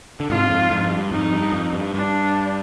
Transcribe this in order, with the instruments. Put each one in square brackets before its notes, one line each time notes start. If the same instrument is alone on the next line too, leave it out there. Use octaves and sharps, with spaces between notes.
[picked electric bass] D3
[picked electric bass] G#2 C3 [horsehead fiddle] F4
[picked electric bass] F2 G#2
F2 G#2
G2
[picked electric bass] F2 G#2 [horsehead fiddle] D#4
[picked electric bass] G2
F2
G2
[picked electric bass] G2 [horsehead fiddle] D4